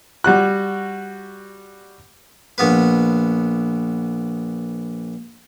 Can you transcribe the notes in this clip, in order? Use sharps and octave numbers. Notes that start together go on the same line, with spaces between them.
G3 F#4 F#6
A#1 B3 B4